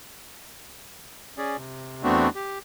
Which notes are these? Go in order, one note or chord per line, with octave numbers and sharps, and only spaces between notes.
C#4 G#4 D5
C3
E2 A3 B3 C4 D4 F#4
G4